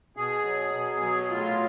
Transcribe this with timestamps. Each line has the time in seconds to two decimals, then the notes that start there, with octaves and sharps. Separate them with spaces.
0.17 B2 G#4
0.45 F#3
0.74 B2
1.02 F#3
1.30 A2 F4